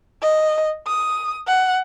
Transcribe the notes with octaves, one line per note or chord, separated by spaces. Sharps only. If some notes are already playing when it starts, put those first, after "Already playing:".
D#5
D#6
F#5